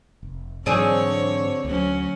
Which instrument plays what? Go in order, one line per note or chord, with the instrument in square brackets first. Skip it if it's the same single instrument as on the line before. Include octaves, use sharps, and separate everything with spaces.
[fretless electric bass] F1
[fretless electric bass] G#2 E3 F#3 [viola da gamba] D3 C#5 [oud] C4 D4 G#4
[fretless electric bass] D2 [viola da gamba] F#3 C#4